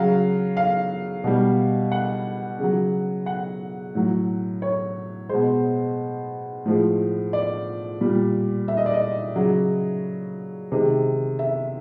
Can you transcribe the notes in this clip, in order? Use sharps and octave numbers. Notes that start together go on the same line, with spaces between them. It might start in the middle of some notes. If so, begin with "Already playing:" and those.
Already playing: C#3 F#3 F5
F5
B2 G3
F#5
C#3 F#3
F#5
A2 F#3
C#5
B2 G#3 C5
A2 F3 G#3
D5
A#2 G3
E5
D#5
D5
D#5
C#3 F#3
C3 D#3 G#3
E5